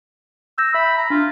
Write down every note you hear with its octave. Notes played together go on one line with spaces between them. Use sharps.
E6 G6 A#6
E5 B5
A#5
D4 F4